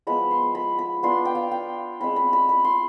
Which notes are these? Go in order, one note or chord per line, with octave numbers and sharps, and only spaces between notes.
F3 G#3 B3 B5
C6
B5
B5
B3 D4 F4 C6
G5
F5
G5
G#3 C4 F4 B5
B5
B5
B5
C6